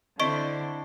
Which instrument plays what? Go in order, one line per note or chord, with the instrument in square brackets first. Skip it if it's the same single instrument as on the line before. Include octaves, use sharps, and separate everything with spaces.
[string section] D3 [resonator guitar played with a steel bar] C4 D4 E4 [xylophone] D#5 C#6 D7